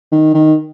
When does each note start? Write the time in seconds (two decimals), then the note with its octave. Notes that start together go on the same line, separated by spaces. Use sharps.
0.12 D#3
0.34 D#3